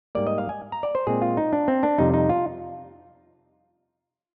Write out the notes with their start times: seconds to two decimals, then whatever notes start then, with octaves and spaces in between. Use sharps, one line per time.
0.15 G#2 G3 A#3 D5
0.27 D#5
0.38 F5
0.49 G#5
0.72 A#5
0.83 D5
0.95 C5
1.07 A#2 G#3 C4 G#4
1.22 F4
1.37 D#4
1.53 D4
1.68 C4
1.83 D4
1.98 F2 C3 G3 D#4
2.14 D#4
2.29 F4